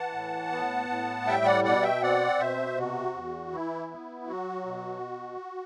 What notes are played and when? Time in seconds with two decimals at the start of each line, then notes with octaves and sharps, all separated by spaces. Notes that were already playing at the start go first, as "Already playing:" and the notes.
Already playing: E3 F#5 A5
0.13 A2
0.52 B3
0.89 A2
1.26 G3 E5 G5
1.45 D5 F#5
1.64 B2 D5 F#5
1.82 E5 G5
2.02 C4 D5 F#5
2.39 B2 C5 E5
2.77 C3 F#4
3.14 E2
3.52 E3 E4
3.90 B3
4.27 F#3 F#4
4.66 B2